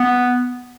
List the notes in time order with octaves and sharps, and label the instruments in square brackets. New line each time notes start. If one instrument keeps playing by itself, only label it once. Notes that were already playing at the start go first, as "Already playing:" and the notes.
Already playing: [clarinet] B3